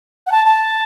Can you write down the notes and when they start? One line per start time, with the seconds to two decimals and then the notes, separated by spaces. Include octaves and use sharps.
0.27 F#5
0.32 A5
0.46 A5